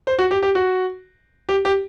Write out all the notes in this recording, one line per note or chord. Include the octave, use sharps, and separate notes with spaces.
C5
F#4
G4
G4
F#4
G4
G4